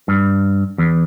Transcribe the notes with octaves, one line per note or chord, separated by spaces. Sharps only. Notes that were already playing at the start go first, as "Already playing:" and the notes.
G2
E2